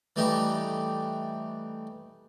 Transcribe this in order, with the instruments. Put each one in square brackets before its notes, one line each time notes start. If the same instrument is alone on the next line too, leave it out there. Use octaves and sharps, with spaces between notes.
[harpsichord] E3 G3 A3 D#4 G4